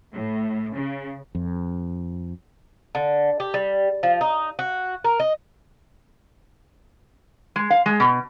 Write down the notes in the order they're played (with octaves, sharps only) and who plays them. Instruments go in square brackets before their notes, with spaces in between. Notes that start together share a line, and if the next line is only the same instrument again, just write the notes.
[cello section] A2
C#3
[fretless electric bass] F2
[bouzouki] D3
G4
G3
F3
D#4
F#4
A#4
D#5
[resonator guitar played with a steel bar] G#3
F5
G#3
B2